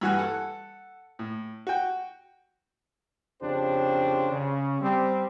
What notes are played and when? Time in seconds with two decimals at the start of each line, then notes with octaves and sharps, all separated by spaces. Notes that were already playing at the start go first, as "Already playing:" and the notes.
0.01 G2 E3 F#4 G#5 F#6
0.19 A4 F#5
1.19 A2
1.67 F#4 G5
3.42 F2 C#3 D4 G4 C5
4.32 C#3
4.81 G3 C4